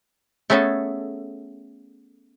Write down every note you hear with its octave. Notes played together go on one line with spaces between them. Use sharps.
A3 B3 C#4 G#4 A4